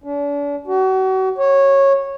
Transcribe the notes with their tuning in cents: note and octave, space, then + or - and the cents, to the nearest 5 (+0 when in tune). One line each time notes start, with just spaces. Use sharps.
D4 -40
F#4 +35
C#5 -15